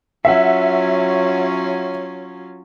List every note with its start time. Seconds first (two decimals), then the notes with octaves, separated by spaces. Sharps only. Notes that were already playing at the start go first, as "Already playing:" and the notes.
0.25 F#3 C#4 F4 E5 F#5